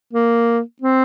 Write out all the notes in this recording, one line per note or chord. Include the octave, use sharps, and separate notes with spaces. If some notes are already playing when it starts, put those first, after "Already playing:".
A#3
C4